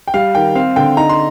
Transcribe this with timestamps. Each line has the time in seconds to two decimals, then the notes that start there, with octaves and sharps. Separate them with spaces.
0.08 G5
0.14 G3 F5
0.35 D#3 G5
0.55 C4 F5
0.76 D3 G5
0.97 D#4 A#5
1.09 C6